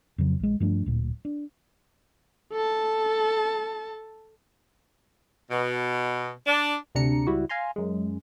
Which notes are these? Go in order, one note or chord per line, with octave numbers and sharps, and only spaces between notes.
F2 C#3 F#3
A#1 G#3
G2 F3 A3 D4
D1 A#2
D4
A4 A5
B2
D4
D2 C3 D4 A#5 C#7
C#2 G3 E4 F#4
F5 G#5 A#5 C6
F#2 G#3